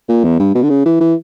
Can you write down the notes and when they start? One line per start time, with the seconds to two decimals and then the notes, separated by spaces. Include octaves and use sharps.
0.09 A#2
0.24 E2
0.40 G2
0.55 B2
0.63 D3
0.70 C#3
0.85 E3
1.01 E3